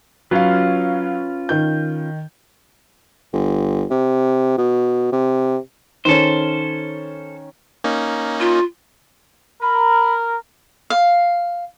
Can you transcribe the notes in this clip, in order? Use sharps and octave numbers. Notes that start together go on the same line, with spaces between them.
F#3 C#4 F4 B4 F5
D#3 G6
G1
C3
B2
C3
D#3 C#4 A4 C5
A#3 C#4 D#4
F4
A#4 B5
F5